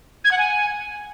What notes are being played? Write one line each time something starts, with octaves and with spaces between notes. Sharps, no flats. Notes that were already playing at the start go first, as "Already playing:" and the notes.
G#6
F#5
G#5